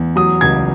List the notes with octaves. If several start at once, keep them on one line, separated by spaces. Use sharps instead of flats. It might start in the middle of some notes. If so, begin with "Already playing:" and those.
Already playing: E2
F#3 D#6
C#2 G#6